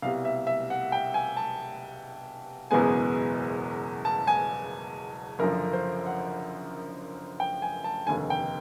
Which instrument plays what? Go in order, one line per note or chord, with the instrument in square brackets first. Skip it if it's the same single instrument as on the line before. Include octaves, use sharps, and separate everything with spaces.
[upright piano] C2 B2 G3 F5
E5
E5
F#5
G5
G#5
A5
F#1 E2 B2 G#3 B3 G#5
A5
G#5
F#1 F#2 D3 F3 A#4
C5
F#5
G5
G#5
A5
F1 D#2 D3 G#5
G5